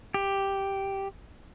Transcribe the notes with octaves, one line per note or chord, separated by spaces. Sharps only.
G4